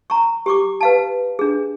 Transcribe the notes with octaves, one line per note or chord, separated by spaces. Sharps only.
A#5 C#6
G4 C#6 D6
B4 F5 A5
D4 G#4